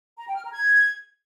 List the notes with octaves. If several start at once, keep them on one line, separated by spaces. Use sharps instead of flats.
A#5
G5
F6
A#5
G#6